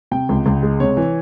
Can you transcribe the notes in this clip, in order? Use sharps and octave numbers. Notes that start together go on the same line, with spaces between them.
C3 G5
C#2
C#2
G#3
C3 C#5
E3